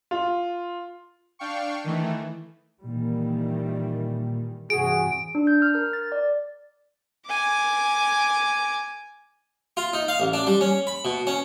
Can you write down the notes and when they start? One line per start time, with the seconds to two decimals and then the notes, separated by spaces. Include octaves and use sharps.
0.11 F4
1.39 D4 F5 G5 C#6
1.84 D#3 E3 A3
2.84 A#2 D#3 E3 G3
4.70 G2 C3 E3 F#4 G#4 D7
5.35 D4
5.47 G6
5.62 F6
5.75 A#4
5.93 A6
6.12 D5
7.27 G#5 D6
9.77 F4
9.93 D#4
10.08 F5
10.20 A1
10.33 D4
10.47 G3
10.61 C#4
10.87 B5
11.05 B2
11.27 C#4